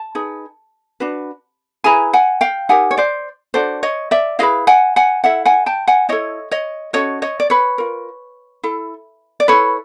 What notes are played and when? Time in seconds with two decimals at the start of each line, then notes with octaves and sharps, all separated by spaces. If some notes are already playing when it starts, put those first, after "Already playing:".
Already playing: A5
0.15 D#4 G#4 B4
1.00 D4 F#4 B4
1.84 E4 G#4 B4 G#5 A#5
2.13 F#5 G#5
2.41 F5 G5
2.69 D#4 G4 A#4 F#5 G#5
2.91 C#5
2.97 C5 D5
3.54 D4 F#4 A4 C5 D5
3.83 C#5 D#5
4.11 D5 E5
4.39 E4 G#4 B4 D#5 F5
4.67 F#5 G#5
4.96 F#5 G#5
5.24 E4 A4 E5 F#5
5.45 F#5 G#5
5.66 G5 A5
5.88 F#5 G#5
6.09 E4 A4 C#5 D#5
6.51 C#5 D#5
6.93 C#4 F#4 A4 C#5 D#5
7.22 C#5 D#5
7.40 D5
7.50 B4 C#5
7.78 F4 A#4
8.64 E4 A4
9.40 D5
9.48 E4 A4 B4 C#5